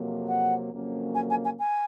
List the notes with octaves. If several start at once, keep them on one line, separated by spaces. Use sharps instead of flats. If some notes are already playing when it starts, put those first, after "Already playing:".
Already playing: F2 C3 F#3 A#3
F#5
F2 C#3 F#3 A#3 C#4
G#5
G#5
G#5
G#5